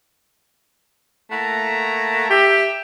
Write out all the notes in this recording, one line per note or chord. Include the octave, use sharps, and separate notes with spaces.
A3 A#3 E4 F#5 A#5
G4 E5